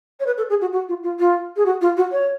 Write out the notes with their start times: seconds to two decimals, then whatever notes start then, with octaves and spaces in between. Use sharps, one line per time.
0.20 C#5
0.26 B4
0.37 A4
0.50 G#4
0.61 F#4
0.72 F#4
0.89 F4
1.03 F4
1.19 F4
1.56 G#4
1.66 F#4
1.81 F4
1.97 F#4
2.12 C#5